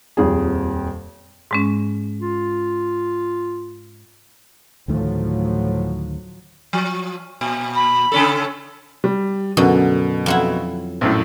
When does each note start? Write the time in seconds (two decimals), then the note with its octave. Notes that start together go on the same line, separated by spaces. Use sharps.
0.17 D#1 F2 G#4
1.51 G#2 G#3 C#4
2.21 F4
4.88 D2 A2 D#3 F3 F#3 A3
6.73 F3
7.41 A#2
7.76 B5
8.12 C#3 C#4 A4
9.04 G3
9.57 F#2 B2 D3
10.26 F2 F#3 E4
11.01 A#1 F#2 A2